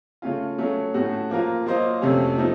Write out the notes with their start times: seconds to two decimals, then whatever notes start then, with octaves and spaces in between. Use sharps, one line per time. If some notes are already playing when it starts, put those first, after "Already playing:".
0.22 C#3 A3 C#4 F4
0.58 F#3 A3 C#4
0.94 A2 A3 C#4 F#4
1.30 F3 A#3 F4 A#4
1.66 F#3 A#3 F4 C5 D#5
2.02 F2 C3 F#3 A3 C#4
2.38 F3 A3 D#4